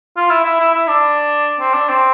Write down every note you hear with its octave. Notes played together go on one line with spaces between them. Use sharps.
F4
E4
E4
E4
E4
D4
C4
D4
C4